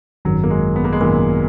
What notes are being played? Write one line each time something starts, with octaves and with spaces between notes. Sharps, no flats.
G#1 F#2 D#3 F#3
A#3
G#3
B3
A#3
G#3
G#1 F#2 A#2 D#3 A#3